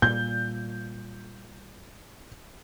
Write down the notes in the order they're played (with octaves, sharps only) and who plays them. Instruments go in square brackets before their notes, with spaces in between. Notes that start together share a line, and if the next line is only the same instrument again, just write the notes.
[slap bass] A#2 G3 [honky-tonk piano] G6